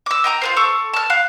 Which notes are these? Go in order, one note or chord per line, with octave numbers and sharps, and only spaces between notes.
D6 E6
D#5 G5 A#5 D#6
F4 B4 C5
A4 C#6 D6
A5 F6
F5 F#6